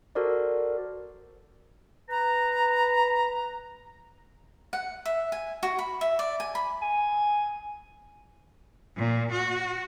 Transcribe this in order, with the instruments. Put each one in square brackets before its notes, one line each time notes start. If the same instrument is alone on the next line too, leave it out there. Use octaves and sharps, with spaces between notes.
[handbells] F#4 A4 A#4 C5 D5
[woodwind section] B4 A#5
[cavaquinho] F#5
E5
G#5
F#4
B5
E5
D5
G#5
B5
[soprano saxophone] G#5
[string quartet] A#2
F#4